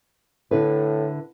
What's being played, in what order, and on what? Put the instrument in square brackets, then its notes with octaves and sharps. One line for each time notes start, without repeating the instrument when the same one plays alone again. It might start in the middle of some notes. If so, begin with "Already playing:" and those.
[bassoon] A2 [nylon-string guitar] D3 E4 B4